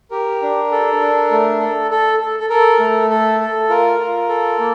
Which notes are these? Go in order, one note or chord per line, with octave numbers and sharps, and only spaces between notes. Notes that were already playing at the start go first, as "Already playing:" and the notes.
G4 A#4
D4
A4
D4
A3
A4
A4
A4
A4
A4 A#4
A3
A4
A4
F4 A#4
F4
A4
A#3